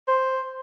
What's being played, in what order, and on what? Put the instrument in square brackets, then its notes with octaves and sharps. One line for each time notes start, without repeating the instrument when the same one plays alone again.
[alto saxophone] C5